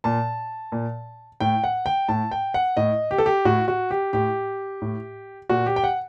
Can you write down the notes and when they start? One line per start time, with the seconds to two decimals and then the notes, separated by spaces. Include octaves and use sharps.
0.04 A#2 A5
0.72 A#2
1.40 A2 G5
1.64 F#5
1.86 G5
2.08 A2 A5
2.31 G5
2.54 F#5
2.77 A2 D#5
3.11 G4
3.18 A4
3.26 G4
3.45 A2 F#4
3.68 F#4
3.91 G4
4.13 A2 G4
4.82 A2
5.49 A#2 F#4
5.66 G4
5.76 G5
5.84 F#5